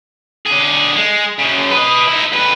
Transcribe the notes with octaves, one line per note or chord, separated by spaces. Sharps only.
D3 G#4
G#3
F#2 C#3
B4 D#5
D#4 E4
F2 B4